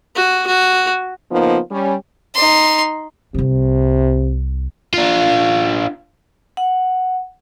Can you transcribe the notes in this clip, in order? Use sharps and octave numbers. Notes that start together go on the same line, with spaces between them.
F#4
F#4
C#3 F3 A#3 B3 D#4 F4
G3 C#4
D#4 C6
C2 C3 G3
D4 F4
F#5